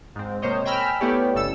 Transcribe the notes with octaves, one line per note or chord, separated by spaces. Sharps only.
G#2 C4
C3 A#3 C5 C#5 D#5
G5 G#5 A#5 B5 E6 F6
A3 B3 E4 G4 C#5 D5
G1 C#3 A4 E6